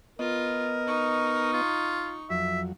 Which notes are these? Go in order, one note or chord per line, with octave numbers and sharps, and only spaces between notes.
B3 F4 A#4 D#5
D#4 C#6
F4
F2 F#3 E5